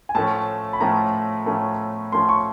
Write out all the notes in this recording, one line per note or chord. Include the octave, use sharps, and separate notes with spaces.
G#5
A2 F3 A3 C#4 A5
B5
A2 F3 A3 C#4 A#5
A2 F3 A3 C#4
A2 F3 A3 C#4 C6
C#6